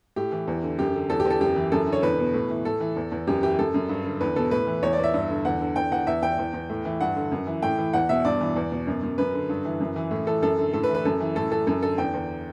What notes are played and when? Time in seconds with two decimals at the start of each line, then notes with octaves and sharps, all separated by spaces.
0.16 A2 G4
0.32 E3
0.48 E2
0.63 D3
0.78 F#2 G4
0.94 D3
1.10 E2 A4
1.20 G4
1.25 E2
1.30 A4
1.40 F#2 G4
1.56 E3
1.72 F#2 A4
1.87 D3
1.93 C#5
2.03 E2 B4
2.18 B2
2.34 A2
2.50 E3
2.65 A2 A4
2.81 E3
2.96 E2
3.12 E2
3.27 F#2 G4
3.43 E3 G4
3.58 F#2 A4
3.74 F#2
3.89 G2
4.04 D3
4.21 E2 B4
4.36 B2 A4
4.51 A2 B4
4.67 E3
4.83 E2 C#5
4.93 D5
4.98 E2
5.04 E5
5.14 G2
5.30 D3
5.45 E2 F#5
5.61 D3
5.76 E2 G5
5.92 E2 F#5
6.07 E2 E5
6.22 E2 G5
6.39 E2
6.53 E2
6.70 A2
6.85 E3
7.01 G2 F#5
7.16 D3
7.31 F#2
7.47 E3
7.62 A2 G5
7.78 E3
7.93 E2 F#5
8.09 B2 E5
8.25 G2 D5
8.41 E3
8.56 E2
8.72 B2
8.87 F#2
9.03 F#2
9.18 F#2 B4
9.34 D3
9.49 G2
9.65 E3
9.80 F#2
9.96 E3
10.11 A2
10.27 E3 A4
10.42 F#2 A4
10.58 D3
10.73 A2 A4
10.84 B4
10.89 E3
10.95 B4
11.05 F#2 A4
11.20 E3
11.36 A2 A4
11.51 E3 A4
11.67 F#2 A4
11.82 D3 A4
11.98 E2 G5
12.14 E2